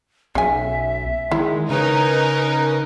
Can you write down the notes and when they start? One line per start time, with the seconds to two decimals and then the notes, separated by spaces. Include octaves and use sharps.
0.35 B1 C#3 E5 G#5
1.31 D#3 G#3 E4
1.70 C#3 C#4 D#4 A#4 B4